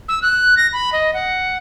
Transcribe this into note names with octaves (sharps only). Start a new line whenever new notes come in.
E6
F#6
A#6
B5
D#5
F#5